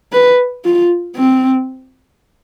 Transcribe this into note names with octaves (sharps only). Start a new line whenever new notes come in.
B4
F4
C4